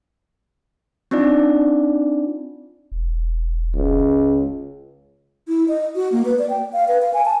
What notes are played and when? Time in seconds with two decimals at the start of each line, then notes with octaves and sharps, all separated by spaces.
1.11 C4 D4 D#4 F4 D5
2.92 E1
3.75 C#2
5.48 E4
5.68 D#5
5.95 F#4
6.12 A#3
6.25 B4
6.38 D5
6.50 G5
6.73 F5
6.88 B4
7.02 F5
7.13 G#5
7.25 A5